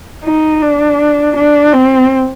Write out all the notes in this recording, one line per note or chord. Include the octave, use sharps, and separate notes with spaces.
D#4
D4
D4
C4